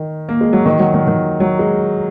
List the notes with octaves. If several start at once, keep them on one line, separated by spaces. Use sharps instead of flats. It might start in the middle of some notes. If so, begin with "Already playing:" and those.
Already playing: D#3
A#3
G#3
F#3
D#3
F#3
D#3
D#3
F#3
G#3